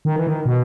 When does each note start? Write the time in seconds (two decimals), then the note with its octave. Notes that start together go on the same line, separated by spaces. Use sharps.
0.05 D#3
0.16 E3
0.27 D#3
0.46 B2